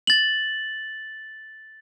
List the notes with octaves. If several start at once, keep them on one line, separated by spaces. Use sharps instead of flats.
A6 F#7